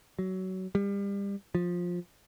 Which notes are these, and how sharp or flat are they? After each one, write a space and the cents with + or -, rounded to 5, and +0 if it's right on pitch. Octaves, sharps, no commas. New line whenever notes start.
F#3 +20
G3 +30
F3 +15